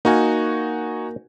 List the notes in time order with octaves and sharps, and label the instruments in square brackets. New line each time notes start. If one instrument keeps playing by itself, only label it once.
[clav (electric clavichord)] A#3 [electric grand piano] D#4 F#4 G#5